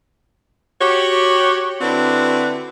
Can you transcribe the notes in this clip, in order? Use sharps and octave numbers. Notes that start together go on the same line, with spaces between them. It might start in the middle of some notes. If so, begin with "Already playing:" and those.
F#4 G4 C#5
D3 C4 D4 E4 F#4 B4